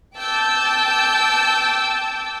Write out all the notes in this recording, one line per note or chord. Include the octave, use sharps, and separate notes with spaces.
G5 A5 D6 E6 G6